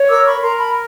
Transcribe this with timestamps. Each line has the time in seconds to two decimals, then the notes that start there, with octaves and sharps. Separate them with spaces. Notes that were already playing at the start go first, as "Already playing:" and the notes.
Already playing: C#5
0.09 A#4 D6 E6
0.25 B5 C#6
0.41 A#4 A#5 C6
0.58 A5 B5